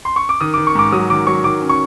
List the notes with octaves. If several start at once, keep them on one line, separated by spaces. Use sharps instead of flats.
C6
C#6
D6
D#3 D#6
D6
D#3
C#6
G#2 D6
F#3 D#6
D#3 D6
F#3 C#6
D#3 D6
C#4
C#6